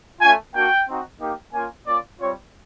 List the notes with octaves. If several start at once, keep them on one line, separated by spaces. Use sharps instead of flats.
A3 C#4 F4 G#5
A#3 D4 F#4 G5
C4 D#4 F#4
A#3 D#4 G4
A#3 C#4 F4 G#5
A#3 C#4 F4 D5
G3 C4 F4 C#5